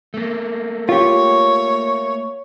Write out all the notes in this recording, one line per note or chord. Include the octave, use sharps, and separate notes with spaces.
A3 A#3
F4 G4 C#5